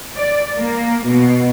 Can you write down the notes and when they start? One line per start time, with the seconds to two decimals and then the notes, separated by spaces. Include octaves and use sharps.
0.16 D5
0.57 A#3
1.06 B2